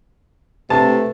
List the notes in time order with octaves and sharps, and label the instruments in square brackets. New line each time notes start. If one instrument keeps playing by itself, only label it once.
[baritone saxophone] C3 [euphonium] A3 [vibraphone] B4 [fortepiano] A5